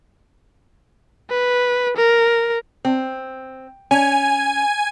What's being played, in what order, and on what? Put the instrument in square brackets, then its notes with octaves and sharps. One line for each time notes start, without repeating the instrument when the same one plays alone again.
[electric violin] B4
A#4
[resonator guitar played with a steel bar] C4
[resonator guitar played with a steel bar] C#4 [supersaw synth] G#5